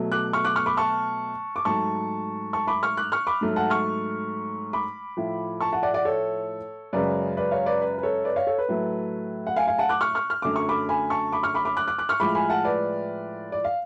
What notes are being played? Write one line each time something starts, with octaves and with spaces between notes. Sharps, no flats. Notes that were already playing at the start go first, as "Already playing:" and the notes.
Already playing: B2 F#3 A3
D6 F#6
C#6 F6
D6 F#6
C#6 F6
B5 D6
A5 C#6
D6
G#2 F#3 A3 A5 C#6
A5 C#6
B5 D6
C#6 F6
D6 F#6
C#6 F6
B5 D6
G#2 F#3 A3
F#5 A5
C#6 F6
B5 D6
A2 F3 A3
A5 C#6
F#5 A5
D5 F#5
D5 F#5
A4 C#5
F#2 C#3 G#3 B4 D5
B4 D5
C#5 F5
B4 D5
B4
B4
A4 C#5
B4 D5
C#5 F5
A4 C#5
B4
A2 F#3 A3
F#5
F5 G#5
F5 G#5
F#5 A5
D6 F#6
C#6 F6
C#6 F6
F6
F#2 D3 F#3 A3 D6
C#6
B5 D6
G#5 B5
A5 C#6
B5 D6
C#6 F6
B5 D6
B5 D6
D6 F#6
D6 F#6
D6 F#6
C#6 F6
A2 F3 G#3 B5 D6
G#5 B5
F#5 A5
B4 D5
D5
F5